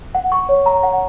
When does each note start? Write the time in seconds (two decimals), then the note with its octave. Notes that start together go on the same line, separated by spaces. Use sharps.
0.15 F#5
0.32 C#6
0.49 C#5
0.66 A#5
0.83 F#5